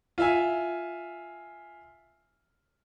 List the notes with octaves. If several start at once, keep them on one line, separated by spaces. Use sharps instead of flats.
F4 E5 G#5